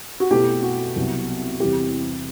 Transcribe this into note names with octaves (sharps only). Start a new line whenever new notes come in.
F#4
B2 A3 E4 G4
F#4
C2 C3 F#3 B3
E2 C3 G3 C4 E4 G4